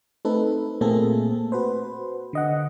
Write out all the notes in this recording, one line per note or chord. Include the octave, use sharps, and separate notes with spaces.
A3 C4 D#4 A4 B4
A#2 A3 A#3 C4 G#4 A4
F#4 B4 C5
D3 D#5 F#5